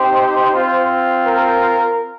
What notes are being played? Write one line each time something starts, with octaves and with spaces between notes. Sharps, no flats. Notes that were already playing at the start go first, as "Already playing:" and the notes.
Already playing: C4 D#4 G4 C5
C4 F4
A#4